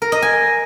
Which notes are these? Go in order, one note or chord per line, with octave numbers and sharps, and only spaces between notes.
A#4
D#5
G#5